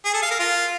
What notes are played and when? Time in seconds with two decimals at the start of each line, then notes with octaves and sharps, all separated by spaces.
0.05 G#4
0.14 A4
0.22 F5
0.31 A#4
0.39 F4